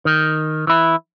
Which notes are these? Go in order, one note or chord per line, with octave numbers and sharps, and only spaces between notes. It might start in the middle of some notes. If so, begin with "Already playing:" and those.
D#3
E3 E4